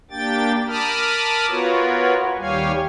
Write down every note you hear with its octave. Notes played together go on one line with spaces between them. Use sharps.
A#3 D4 G4 G5 A6
A#4 A5 B5 D6 D#6 F6
B3 F4 F#4 A#4 B4 C#5
D#2 G3 G4 C#5 F5 G#5